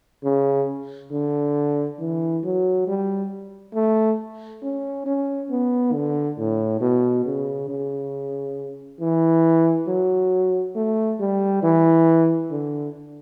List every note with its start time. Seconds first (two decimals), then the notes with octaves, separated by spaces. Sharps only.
0.24 C#3
1.11 D3
2.00 E3
2.44 F#3
2.88 G3
3.74 A3
4.62 C#4
5.06 C#4
5.50 B3
5.93 D3
6.38 A2
6.81 B2
7.25 C#3
7.69 C#3
9.00 E3
9.87 F#3
10.75 A3
11.20 G3
11.63 E3
12.50 D3